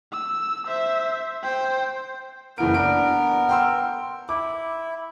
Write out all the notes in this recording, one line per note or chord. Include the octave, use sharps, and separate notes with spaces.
E6
C5 E5
C5 G5
F#1 E3 B3 A#4 D7
D4 D7
G5 C6 E6
E4 D6